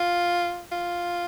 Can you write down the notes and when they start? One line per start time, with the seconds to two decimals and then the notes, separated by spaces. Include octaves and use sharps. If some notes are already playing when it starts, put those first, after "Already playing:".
Already playing: F4
0.72 F4